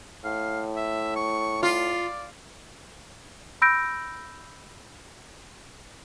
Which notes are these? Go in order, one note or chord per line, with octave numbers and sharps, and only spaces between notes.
A2 F5
E5
C#6
F4 D5
B5 E6 G6 A#6 D7